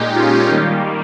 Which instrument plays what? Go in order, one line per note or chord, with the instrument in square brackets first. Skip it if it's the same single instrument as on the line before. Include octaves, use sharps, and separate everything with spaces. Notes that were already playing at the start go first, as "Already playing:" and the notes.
Already playing: [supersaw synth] A#2 G#3 D#4 G4
C#4 F4
D#3 G3 A#3